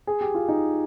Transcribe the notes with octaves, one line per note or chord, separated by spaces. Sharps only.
G#4
G4
F4
D#4